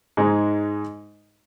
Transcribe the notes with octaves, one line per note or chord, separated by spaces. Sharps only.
G#2 G#3 D#4